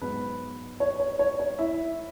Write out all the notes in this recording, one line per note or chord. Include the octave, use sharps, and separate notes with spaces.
G#2 F#3 B3 B4
C#5
C#5
C#5
C#5
E4 E5